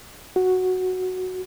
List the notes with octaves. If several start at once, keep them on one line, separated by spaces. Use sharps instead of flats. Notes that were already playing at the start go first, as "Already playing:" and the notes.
F#4